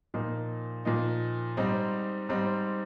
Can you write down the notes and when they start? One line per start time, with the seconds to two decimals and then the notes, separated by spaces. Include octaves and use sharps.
0.14 A#2 F3 A#3 D#4
0.85 A#2 F3 A#3 D#4
1.57 G#2 G3 C4 D#4
2.29 G#2 G3 C4 D#4